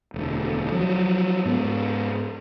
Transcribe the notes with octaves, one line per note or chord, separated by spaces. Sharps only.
E1 D2
F3 F#3
G#2 B3